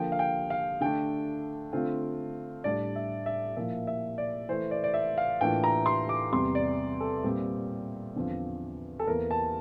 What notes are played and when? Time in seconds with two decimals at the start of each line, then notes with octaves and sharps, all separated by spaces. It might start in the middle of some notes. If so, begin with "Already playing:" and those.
Already playing: D3 F3 A#3 G5
0.12 F5
0.19 G5
0.50 F5
0.81 D3 A3 D4 G5
1.73 D3 A3 C4 F4
2.64 A2 G3 D4 D5
2.96 E5
3.26 E5
3.56 A#2 F3 A#3 E4 E5
3.87 E5
4.18 D5
4.49 E3 A3 E4 C5
4.71 D5
4.84 D5
4.94 E5
5.18 F5
5.41 A2 E3 A#3 D4 F4 G5
5.64 A#5
5.86 C6
6.09 D6
6.32 E2 C3 G3 C6
6.55 D5
7.00 A4
7.24 A#2 G3 C4
8.16 E2 D3 F3 C4 F4
9.00 A4
9.07 E2 E3 A#3 A#4
9.31 A5